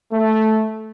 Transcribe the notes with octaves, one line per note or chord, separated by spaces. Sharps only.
A3